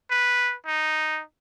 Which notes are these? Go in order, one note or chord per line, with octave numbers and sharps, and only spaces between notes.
B4
D#4